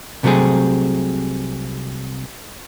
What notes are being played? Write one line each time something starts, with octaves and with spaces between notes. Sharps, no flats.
C2 C3 F#3 A3 C4 G#4